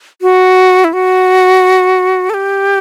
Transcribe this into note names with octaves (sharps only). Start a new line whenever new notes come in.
F#4
E4
F#4
A4
G4